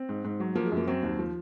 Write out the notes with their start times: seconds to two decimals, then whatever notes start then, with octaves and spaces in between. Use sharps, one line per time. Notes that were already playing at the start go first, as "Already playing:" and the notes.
Already playing: C4
0.09 G#2
0.24 G#2
0.40 F#3
0.55 F3 A#3
0.66 G#3
0.72 F#2 A#3
0.87 F#3 C4
1.03 D#2
1.19 F3